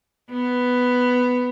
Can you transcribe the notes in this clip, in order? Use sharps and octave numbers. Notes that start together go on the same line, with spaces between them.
B3